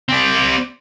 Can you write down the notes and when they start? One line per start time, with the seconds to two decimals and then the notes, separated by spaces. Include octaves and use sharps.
0.09 C4 D5